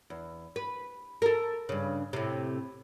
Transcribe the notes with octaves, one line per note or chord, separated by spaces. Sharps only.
E2
B4
A4 A#4
G2 C#3
A2 C3